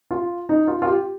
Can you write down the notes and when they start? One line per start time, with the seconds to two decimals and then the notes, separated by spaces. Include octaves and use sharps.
0.11 F4
0.49 D#4
0.68 F4
0.82 F4
0.87 G4